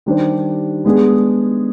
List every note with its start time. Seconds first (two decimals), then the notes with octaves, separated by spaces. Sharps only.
0.06 D#3 G3 D4 G4 C5
0.85 G#3 B3 D4 G#4